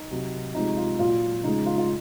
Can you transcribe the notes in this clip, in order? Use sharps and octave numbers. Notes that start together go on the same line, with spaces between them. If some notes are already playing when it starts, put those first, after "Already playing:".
Already playing: D#4
C3 F#3
C3 F3 G#3 D#4
F4
A#2 F#3 F4
C#3 F3 G#3 D#4
F4
F4